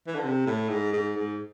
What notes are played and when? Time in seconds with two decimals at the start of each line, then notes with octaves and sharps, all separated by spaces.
0.07 E3
0.15 D3
0.24 C3
0.46 A2
0.69 G#2
0.93 G#2
1.16 G#2